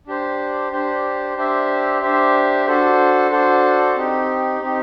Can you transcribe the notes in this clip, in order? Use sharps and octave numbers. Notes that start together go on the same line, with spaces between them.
D4 G4 C5
D4 G4 C5
D4 G4 C5 E5
D4 G4 C5 E5
D4 F#4 A4 C5
D4 F#4 A4 C5
C4 D#4 G4
C4 D#4 G4